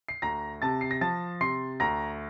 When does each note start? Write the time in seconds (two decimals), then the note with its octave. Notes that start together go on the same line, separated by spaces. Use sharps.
0.09 C7
0.22 D2 A#5 A#6
0.62 C3 A5 A6
0.81 C7
0.91 A#6
1.01 F3 A5 A6
1.41 C3 C6 C7
1.80 D2 A#5 A#6